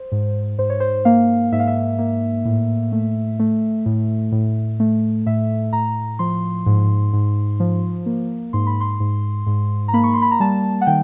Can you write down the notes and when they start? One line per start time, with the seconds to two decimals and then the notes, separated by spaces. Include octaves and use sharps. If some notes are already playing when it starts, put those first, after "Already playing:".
Already playing: C5
0.12 G#2
0.58 G#2 C5
0.70 C#5
0.80 C5
1.05 A#3 F5
1.52 G#2 E5
1.60 F5
1.67 E5
1.99 A#3
2.45 A2
2.92 A3
3.39 A3
3.86 A2
4.32 A2
4.80 A3
5.26 A2 E5
5.73 A2 A#5
6.19 F3 C6
6.66 G#2
7.13 G#2
7.60 F3
8.06 A#3
8.53 G#2 C6
8.67 B5
8.81 C6
9.00 G#2
9.46 G#2
9.88 A#5
9.93 A#3 B5
10.03 C#6
10.13 C6
10.22 B5
10.31 A#5
10.40 G3 A5
10.81 F#5
10.86 D#3 G5